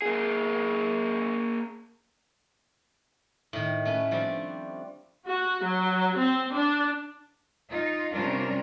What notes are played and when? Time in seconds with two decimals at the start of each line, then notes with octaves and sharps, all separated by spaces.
0.02 A#3 G#4
3.53 A2 D#3
3.85 A3 C#4 A4 B4
4.11 F3 G3 C4 D4
5.27 F#4
5.65 F#3
6.18 C4
6.55 D4
7.70 D#4 F4
8.12 C3 G3 C#4 D4 F4 A#4